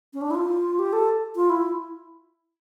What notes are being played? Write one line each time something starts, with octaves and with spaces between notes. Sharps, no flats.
C#4
D4
E4
F4
G4
A4
F4
E4